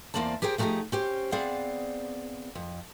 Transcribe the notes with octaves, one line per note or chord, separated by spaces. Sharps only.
E2 D#3 A#3 C4 D5 A5
G4 G#4 A#4 C5 G5
F3 A3 D#4 F4 G4 G#4
C#4 G4 C5
B3 C4 G#4 D5 F5 F#5
F2